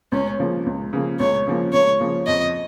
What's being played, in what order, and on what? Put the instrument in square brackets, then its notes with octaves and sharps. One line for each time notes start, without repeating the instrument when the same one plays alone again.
[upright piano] C#2 [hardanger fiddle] C#4
[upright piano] C#3 F3 A#3
C#2
C#3 F3 A#3
[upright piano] C#2 [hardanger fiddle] C#5
[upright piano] C#3 F3 A#3
[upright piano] C#2 [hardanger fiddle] C#5
[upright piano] C#3 F3 A#3
[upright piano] F2 [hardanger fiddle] D#5